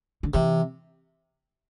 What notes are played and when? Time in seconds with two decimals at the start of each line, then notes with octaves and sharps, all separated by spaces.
0.23 D3
0.34 C3 E3